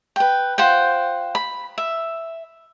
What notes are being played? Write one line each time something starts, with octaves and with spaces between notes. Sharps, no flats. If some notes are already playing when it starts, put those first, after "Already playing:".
B4 G5
F4 C5 F#5 G5
B5
E5